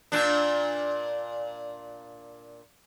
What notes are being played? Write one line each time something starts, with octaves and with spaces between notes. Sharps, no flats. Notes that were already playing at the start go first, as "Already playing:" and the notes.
A#2 D4